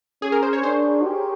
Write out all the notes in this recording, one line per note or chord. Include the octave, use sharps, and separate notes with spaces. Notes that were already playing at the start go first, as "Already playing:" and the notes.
C#4 G#4
A#4
C5
C#5
D4 C5
G4